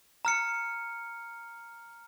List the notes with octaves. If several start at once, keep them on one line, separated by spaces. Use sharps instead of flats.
A#5 F6 C#7